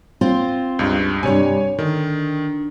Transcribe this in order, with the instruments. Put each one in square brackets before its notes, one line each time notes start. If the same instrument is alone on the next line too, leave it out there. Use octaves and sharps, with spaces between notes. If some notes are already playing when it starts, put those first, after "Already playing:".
[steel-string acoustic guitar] C4 F4 C5
[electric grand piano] C#2 G2
[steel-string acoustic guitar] G2 C3 [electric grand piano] C#5 G#5
[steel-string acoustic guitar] D3 [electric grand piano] D#3